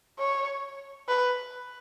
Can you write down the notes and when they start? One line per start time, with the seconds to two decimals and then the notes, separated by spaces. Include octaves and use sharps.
0.19 C#5
1.08 B4